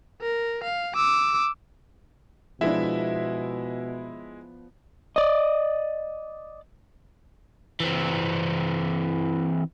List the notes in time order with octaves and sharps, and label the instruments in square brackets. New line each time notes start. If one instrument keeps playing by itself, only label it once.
[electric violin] A#4
F5
D6 E6
[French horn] B2 [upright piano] F3 B3 D4 [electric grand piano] G#3 E4 E5
[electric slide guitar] D5 D#5
[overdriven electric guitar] E3 C4